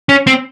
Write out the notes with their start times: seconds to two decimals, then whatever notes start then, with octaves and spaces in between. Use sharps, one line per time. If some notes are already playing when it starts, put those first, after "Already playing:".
0.09 C#4
0.27 C4